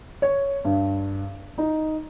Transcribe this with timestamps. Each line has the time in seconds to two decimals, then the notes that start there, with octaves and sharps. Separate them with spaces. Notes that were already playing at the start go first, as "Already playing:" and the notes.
0.22 C#5
0.65 G2
1.58 D#4